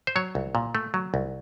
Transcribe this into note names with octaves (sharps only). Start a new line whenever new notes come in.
C5
F#3 C#5
C2
A#2
A3
F#3
C2